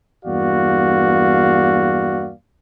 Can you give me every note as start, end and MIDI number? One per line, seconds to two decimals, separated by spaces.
0.24 2.32 40
0.24 2.32 43
0.24 2.32 58
0.24 2.32 66
0.24 2.32 74
0.24 2.32 77